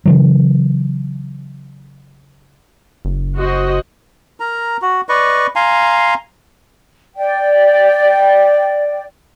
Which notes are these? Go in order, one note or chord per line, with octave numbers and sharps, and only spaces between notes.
C#3 E3 F#3
F#1
F#4 C5 D#5
A#4 A#5
F#4
B4 D5 D#5 C#6
F5 G#5 A#5 C6
D5 G5